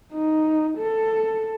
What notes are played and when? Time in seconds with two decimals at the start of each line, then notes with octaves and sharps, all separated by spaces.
0.13 D#4
0.78 A4